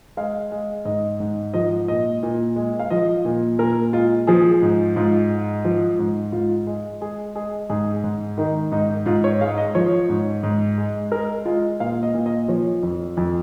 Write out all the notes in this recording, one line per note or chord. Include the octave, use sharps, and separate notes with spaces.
G#3 F5
G#3
G#2 D#5
G#2
F3 D#5
A#2 D#5
A#2
G#3
F5
F3 D#5
A#2
A#2 A#4
G#3 F4
F3 G#4
G#2
G#2 F4
G#3
F3
G#2
G#2 F4
G#3
G#3 G#4
G#3 G#4
G#2 G#4
G#2
D#3 D#4
G#2 D#4
G#2 F4
C#5
G#3 F5
D#5
F3 C#5
G#2
G#2
G#3
G#3 A#4
G#3 F4
A#2 F5
D#5
A#2
D#5
F3 C#5
F2
F2